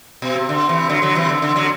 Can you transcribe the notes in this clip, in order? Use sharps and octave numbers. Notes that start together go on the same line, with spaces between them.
B2
C3
D3
C3 E3
D3 F#3
D3 F#3
C3 E3
D3
D3
D3 F#3